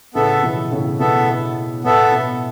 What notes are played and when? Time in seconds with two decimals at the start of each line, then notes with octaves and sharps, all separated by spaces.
0.14 A2 C#3 B3 A4 E5
0.43 B2 E3
0.71 A2 C#3
0.99 B2 B3 A4 E5
1.84 A2 B3 A4 E5
2.12 B2